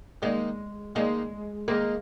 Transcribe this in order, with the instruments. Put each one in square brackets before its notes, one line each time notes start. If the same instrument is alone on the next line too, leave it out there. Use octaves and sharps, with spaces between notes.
[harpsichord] D#3 A#3 D#4 [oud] G#3
[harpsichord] D#3 A#3 D#4 [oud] G#3
[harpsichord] D#3 G#3 D#4 [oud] A#3